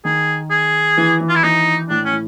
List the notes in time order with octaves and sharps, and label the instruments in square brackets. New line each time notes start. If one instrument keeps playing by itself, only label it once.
[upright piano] D#3 [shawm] G#4
[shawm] G#4
[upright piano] E3
E3
[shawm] F4
E4
[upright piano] E3 [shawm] D#4
[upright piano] A2 [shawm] D4
[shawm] C#4
[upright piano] A2